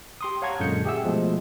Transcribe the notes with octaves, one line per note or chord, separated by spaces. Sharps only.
G4 C6 D#6
C#5 F5 F#5 A5 A#5 G#6
F#2 A#2 D3 G#3 G6 C#7
G4 G#4 E5 F#5 E6
B2 F3 G#3 A3